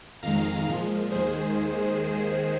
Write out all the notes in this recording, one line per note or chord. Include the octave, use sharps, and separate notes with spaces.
F2 D#3 G#3 F5 A#5
A#2 F3 G#3
D#2 D#3 G#3 G#4 C5